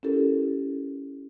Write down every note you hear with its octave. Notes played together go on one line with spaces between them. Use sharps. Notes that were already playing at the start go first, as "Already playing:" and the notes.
C#4 E4 G4 A4 A#4